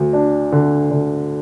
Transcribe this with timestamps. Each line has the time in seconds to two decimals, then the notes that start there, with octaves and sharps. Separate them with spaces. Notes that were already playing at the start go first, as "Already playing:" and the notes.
Already playing: D2
0.13 D4
0.52 D3
0.91 D3